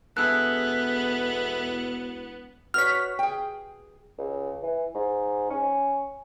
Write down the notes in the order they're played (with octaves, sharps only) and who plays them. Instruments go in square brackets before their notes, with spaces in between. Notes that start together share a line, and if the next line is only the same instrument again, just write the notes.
[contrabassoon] E1 [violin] B3 [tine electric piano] E4 G#4 A4 [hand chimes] E6 F#6
[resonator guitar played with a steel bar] F#4 B4 C#5 [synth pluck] F6 B6
[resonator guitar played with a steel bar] G#4 G5
[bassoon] C#2
E3
G#2
C#4